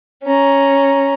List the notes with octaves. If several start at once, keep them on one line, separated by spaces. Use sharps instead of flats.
C#4 A#5